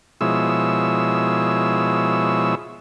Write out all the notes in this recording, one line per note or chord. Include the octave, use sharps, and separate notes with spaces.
B2 F3 G#3 E4 C#5 E6